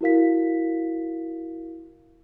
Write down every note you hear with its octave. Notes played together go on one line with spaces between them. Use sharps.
E4 F#4 A#4 F5 B6